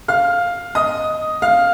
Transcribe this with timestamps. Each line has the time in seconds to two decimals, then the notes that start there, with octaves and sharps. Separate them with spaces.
0.08 F5 F6
0.75 D#5 D#6
1.42 F5 F6